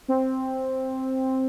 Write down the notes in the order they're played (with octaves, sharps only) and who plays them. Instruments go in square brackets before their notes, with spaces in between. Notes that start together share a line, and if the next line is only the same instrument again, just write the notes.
[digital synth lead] C4